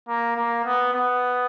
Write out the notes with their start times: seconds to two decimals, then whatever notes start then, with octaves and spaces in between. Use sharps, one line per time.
0.08 A#3
0.37 A#3
0.65 B3
0.93 B3